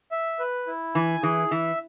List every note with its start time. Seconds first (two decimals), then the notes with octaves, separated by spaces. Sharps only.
0.11 E5
0.39 B4
0.67 E4
0.95 E3 G#5
1.23 E3 G#4
1.51 E3 E5